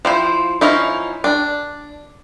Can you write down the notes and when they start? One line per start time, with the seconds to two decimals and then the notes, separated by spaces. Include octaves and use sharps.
0.05 F3 E4 C5
0.61 F3 C#4 D#4 E4
1.24 D4